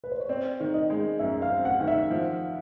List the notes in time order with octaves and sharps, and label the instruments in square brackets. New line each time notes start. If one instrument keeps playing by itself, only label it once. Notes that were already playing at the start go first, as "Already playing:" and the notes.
[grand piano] B4
C5
C#5
[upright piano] C4 [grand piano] D5
[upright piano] D#3
[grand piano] D#5
[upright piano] G#3
[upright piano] F#2 [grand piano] E5
[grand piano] F5
[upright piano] C4
[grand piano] F#5
[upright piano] D#3
[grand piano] E5
[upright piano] F3